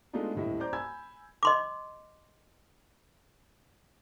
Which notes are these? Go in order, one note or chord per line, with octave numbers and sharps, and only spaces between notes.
G#3 A3 B3 D4 D#4 F4
D#1 D2 A2 D#5 E5
C5 D5 A#5 D6 G6
G#5 B5 E6 G#6
D#5 C6 D6